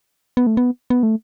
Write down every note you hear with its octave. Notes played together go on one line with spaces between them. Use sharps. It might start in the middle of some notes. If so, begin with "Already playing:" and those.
B3
A3
B3
B3
A3